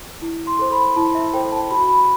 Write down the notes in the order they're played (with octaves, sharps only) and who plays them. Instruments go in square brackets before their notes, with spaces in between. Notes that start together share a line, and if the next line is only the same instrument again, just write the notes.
[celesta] E4
C6
A4 C5
B5
E4 A5
E5
A4 C5 G5
A5
F#4 B5
B5